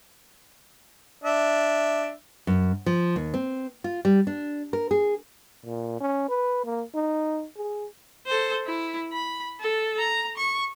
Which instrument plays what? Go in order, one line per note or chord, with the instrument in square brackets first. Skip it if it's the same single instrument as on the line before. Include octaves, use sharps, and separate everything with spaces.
[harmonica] D4 E5
[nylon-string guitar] F#2
F3
D#2
C4
F4
G3
D4
A#4
G#4
[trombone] A#2
C#4
B4
A#3
D#4
G#4
[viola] A4 C5
E4
B5
A4
A#5
C#6